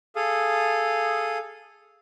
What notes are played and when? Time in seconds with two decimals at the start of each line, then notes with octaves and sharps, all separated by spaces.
0.16 G#4 A4 F5 D#6